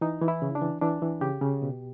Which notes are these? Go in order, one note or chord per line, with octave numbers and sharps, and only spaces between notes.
E3 D#4
E3
E4
C#3
D4
E3
E3 D4
E3
C#3 G4
C#3
B2